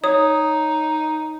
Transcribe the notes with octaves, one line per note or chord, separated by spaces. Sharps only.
D#4 C#5 D#6